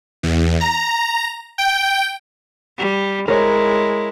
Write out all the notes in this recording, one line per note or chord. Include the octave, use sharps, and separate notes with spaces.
E2
A#5
G5
G3
G#3 E4 A#4 C#5